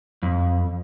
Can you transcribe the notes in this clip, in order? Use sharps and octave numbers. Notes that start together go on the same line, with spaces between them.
F2